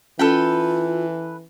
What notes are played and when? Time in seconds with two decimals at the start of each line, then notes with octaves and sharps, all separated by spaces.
0.19 E3 C#4 F4 A4 B4 G5